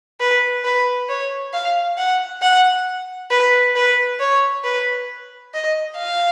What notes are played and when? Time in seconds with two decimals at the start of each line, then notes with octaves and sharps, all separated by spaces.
0.20 B4
0.65 B4
1.09 C#5
1.54 F5
1.98 F#5
2.42 F#5
3.31 B4
3.76 B4
4.20 C#5
4.64 B4
5.53 D#5
5.98 F5